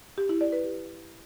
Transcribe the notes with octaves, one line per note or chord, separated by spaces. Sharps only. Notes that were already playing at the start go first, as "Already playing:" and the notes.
G4
E4
D5
B4
G4